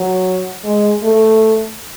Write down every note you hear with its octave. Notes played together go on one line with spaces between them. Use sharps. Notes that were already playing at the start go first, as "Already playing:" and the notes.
Already playing: F#3
G#3
A3